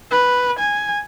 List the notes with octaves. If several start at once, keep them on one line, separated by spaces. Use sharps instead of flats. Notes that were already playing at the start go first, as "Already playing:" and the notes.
B4
G#5